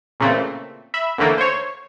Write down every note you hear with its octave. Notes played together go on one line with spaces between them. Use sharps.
A#2 C#3 E3 A3 C4
E5 B5
D#2 D3 E3 A3 A#3
C5 C#5